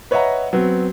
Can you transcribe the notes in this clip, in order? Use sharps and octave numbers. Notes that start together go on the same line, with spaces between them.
B4 C#5 D#5 E5 F#5 A#5
F#3 B3 C4